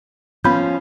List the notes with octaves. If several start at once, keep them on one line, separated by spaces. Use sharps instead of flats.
F3 B3 C#4 F4 B5 G6